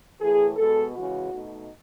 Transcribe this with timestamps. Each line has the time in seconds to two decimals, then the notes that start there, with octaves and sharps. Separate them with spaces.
0.18 A2 E3 A3 G#4
0.56 B2 G#3 B3 A4
0.94 C#3 E3 G#3 F#4
1.32 B2 A3 D#4